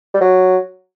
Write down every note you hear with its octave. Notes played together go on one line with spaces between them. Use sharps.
G3
F#3